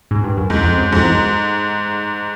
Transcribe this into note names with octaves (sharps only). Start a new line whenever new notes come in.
G#2
G2
F#2
F2 G#2
E2
F2
F#2
F2 G#2
E2
F#2